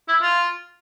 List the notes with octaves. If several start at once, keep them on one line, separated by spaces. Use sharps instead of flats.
E4
F4